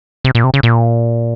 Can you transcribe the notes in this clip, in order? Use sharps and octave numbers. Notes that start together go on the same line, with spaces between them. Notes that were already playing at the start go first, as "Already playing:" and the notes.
C3
A#2
C3
C#3
A#2